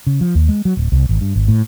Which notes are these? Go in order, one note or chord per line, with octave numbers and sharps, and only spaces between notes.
C#3
F3
D#2
G#3
F#3
D1
C2
G#1
G2
G#1
A2